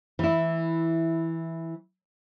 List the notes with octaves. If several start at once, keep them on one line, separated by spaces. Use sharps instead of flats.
E3 E4